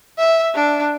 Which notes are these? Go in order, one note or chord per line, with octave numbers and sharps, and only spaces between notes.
E5
D4